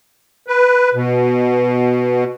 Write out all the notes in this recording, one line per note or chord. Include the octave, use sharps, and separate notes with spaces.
B4
B2